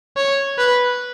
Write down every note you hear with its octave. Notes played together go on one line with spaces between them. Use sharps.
C#5
B4